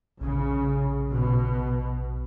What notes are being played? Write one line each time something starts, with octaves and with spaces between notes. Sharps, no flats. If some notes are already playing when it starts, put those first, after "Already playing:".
A#1 C#3
B2